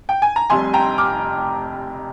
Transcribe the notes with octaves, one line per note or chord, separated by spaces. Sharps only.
G5
G#5
A#5
F1 F2 C3 G3 G#5 C6
G5 A#5
D6 F6